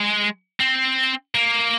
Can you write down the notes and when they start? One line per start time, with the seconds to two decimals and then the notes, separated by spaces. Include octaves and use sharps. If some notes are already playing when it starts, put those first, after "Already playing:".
Already playing: G#3
0.60 C4
1.35 A#3